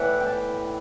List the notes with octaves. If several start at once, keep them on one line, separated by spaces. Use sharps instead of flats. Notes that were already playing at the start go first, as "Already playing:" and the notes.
Already playing: A2 E3 B3 D5 E5 F#5
G5
A5